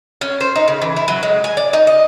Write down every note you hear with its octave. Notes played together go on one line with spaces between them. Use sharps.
C#4
C5
D#4
C#3
E3
E4
F#3
G#3
G#5
D5
D#4
D#5